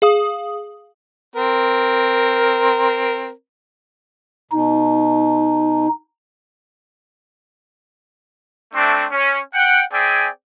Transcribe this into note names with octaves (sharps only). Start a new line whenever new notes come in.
G#4 F5 D#6
C4 A#4
B2 D#4
A3 C4 D4
C#4
F#5 G5
C4 G#4 D5 E5 G5 G#5